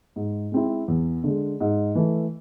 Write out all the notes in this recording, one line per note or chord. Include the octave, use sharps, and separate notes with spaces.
G#2
G#3 C4 E4
E2
D3 G#3
G#2
E3 A3